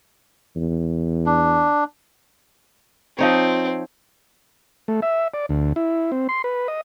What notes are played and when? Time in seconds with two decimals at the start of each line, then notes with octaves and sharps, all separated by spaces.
0.56 E2
1.26 D4
3.19 F3 C4 D#4 C#5
4.88 A3
5.02 E5
5.34 D5
5.49 D2
5.76 E4
6.12 C4
6.29 C6
6.44 B4
6.68 D#5